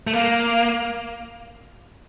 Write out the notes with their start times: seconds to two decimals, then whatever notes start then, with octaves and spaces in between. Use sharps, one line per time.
0.07 A3
0.13 A#3 F5